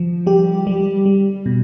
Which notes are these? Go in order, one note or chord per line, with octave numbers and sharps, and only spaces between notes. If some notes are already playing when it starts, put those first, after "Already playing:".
Already playing: F3
G3 G4
G3
G3
B2